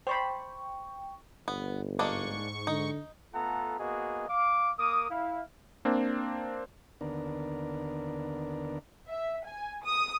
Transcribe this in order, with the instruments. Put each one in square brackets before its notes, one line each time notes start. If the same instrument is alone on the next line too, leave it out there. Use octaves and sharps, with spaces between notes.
[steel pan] C5 D5 B5 [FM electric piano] G5 C#6
[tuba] G1 [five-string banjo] B3
[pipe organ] G#2 C#6 [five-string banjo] G#3 A#3 D4
[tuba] D3 [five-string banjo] D#4
[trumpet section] A3 B3 F4 A4 F#5 A#5
A#3 B3 F#4 G#4 D#5
F5 D6
A#3 A#4 D6 D#6
E4 F5
[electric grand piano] A#3 C4 D4
[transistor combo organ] D#2 D3 B3 D4 A#4
[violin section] E5
G#5
D#6